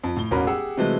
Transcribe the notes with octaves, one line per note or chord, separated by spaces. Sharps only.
F2
A2 G7
E1 A1 C#4 F#4 A#4 B5
G4 G#4 F#5 E6
C3 E3 F#3 G#3 A3